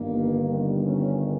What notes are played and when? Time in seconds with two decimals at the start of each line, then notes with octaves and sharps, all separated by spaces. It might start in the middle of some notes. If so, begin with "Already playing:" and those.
Already playing: G1 G2 D#3 A#3
0.82 C#4